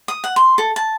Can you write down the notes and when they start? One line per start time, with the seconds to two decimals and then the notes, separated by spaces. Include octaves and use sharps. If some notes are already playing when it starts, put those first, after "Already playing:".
0.08 D#6
0.24 F#5
0.36 C6
0.58 A4
0.76 A5